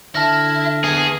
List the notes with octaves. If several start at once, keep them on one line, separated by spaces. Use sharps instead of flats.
D3 E4 A5 F6 A#6
B3 E4 G#4